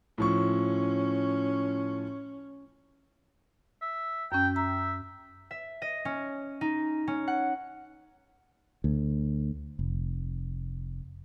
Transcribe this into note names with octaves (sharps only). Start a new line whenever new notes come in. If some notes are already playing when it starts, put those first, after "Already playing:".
A2 F3 C#4 C#6
E5
F#2 C#4 G5
E5 A#5
E5
D#5
C#4
D#4
C#4
F#5
D2
F1